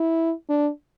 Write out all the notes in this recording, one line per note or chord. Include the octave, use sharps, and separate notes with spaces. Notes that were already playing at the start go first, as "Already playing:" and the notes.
Already playing: E4
D4